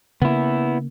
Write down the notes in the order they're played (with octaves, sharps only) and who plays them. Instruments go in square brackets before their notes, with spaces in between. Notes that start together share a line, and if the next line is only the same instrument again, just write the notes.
[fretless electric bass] C#3 A#3 [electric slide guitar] B3 E4